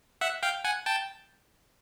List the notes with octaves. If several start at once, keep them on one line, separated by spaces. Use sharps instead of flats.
E5 F#5
F5 G5
F#5 G#5
G5 A5